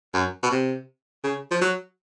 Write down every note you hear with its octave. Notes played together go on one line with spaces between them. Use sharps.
F#2
B2
C3
C#3
F3
F#3